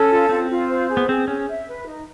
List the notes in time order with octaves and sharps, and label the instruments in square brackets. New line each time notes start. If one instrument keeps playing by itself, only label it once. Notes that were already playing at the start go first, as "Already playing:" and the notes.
Already playing: [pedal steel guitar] C#4 [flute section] A4
[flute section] F4
[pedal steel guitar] C4 [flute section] F4
[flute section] F4
C5
G#4
[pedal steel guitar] B3
[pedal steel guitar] C4 [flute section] G#4
[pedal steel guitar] C#4 [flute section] G#4
[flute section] E5
B4
D#4